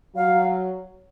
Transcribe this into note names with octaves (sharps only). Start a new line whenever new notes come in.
F#3 F5